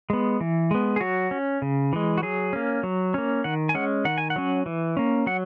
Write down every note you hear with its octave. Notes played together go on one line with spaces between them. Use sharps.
G#3 B3
E3
G#3 B3
G#4
F#3 F#4
C#4
C#3
E3 G#3
F#4
F#3 G#4
A#3 C#4
F#3
A#3 C#4
D#3 F#5
G#5
G#3 C#4 F#5
D#3 F#5
G#5
F#5
F#3 C#4
E3
A#3 C#4
F#3 F#5